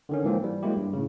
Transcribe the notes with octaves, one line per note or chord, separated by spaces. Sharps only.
D3 D#3 C#4
G#2 E3 F3 A#3 C4
E3 G3
F#3 G#3 A#3 E4 G4
G2
A2 C#3